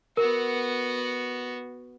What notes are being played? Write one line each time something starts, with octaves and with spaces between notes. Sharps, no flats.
B3 F#4 A#4